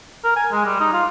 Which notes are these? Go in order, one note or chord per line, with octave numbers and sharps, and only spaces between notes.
A#4
G#5
G#3
G3
D#4
F4